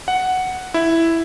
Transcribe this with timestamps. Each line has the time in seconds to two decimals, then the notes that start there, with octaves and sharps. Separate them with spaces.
0.08 F#5
0.74 E4